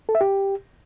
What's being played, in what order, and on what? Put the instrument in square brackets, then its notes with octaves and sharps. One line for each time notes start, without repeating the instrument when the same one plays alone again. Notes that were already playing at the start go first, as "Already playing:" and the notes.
[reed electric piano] A4
E5
G4